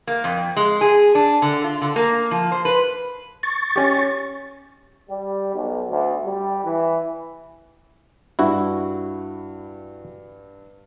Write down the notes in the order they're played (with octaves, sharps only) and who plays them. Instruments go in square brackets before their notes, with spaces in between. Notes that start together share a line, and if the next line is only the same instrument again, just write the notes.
[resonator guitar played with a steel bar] A#3
F2
G#3
G#4
D4
D3
F4
D3
A#3
F3
C5
B4
[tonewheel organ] C#6 A6
[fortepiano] C#4 G4
[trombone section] G3
B1
D2
G3
E3
[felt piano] G2 [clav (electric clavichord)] E4 F#4